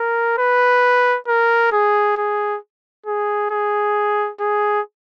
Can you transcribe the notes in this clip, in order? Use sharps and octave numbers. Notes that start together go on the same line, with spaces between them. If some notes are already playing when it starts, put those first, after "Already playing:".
Already playing: A#4
B4
A#4
G#4
G#4
G#4
G#4
G#4